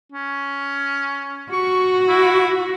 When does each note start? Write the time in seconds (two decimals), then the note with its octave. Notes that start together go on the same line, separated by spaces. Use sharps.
0.12 C#4
1.52 F#4 C#6
2.08 E4